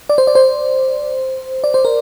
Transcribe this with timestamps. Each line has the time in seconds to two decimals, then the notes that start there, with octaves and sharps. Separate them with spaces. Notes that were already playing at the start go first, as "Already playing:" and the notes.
0.09 D5
0.18 C5
0.27 D5
0.35 C5
1.64 D5
1.74 C5
1.85 A#4